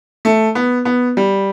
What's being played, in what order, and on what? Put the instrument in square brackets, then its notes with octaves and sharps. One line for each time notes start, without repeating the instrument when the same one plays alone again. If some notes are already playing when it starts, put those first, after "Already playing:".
[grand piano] A3
B3
B3
G3